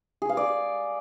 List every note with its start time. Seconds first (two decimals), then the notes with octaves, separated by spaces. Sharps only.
0.22 G#4
0.29 F5
0.37 D5